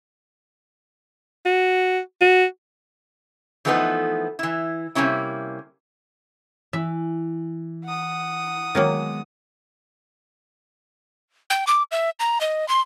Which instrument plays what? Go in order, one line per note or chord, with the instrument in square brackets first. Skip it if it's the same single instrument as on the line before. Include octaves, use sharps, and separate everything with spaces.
[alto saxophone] F#4
F#4
[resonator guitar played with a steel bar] E3 F3 A3 B3 D#4 B4
E3 E4
C3 G3 A#3 C#4 E4
[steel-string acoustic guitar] E3 [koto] E5
[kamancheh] F#5 D#6
[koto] D#3 F#3 A#3 [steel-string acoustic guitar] G#3 B3 D#4
[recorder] G5
D6
E5
A#5
D#5
C6